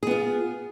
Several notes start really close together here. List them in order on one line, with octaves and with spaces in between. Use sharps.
G#4 B3 F4